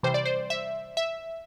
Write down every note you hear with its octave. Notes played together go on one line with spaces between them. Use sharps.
C3 E3 G3 C5
D5
C5
E5
E5